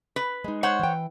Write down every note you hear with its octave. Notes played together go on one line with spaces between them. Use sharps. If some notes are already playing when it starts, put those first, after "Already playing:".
B4
G#3 D#4
C5 C#5 F#5
E3 G5